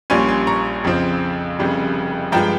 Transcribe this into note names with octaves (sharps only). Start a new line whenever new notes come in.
A#1 A#2 G3 C#4 G#5 C6
G#5 C6
A#5 C#6
F2 C#3 F3 C4
F1 F2 C#3 G3
G2 F3 G#3 G5 A#5